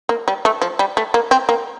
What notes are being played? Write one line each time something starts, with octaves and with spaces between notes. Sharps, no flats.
A#3
G3
A3
F3
G3
A3
A#3
C4
A#3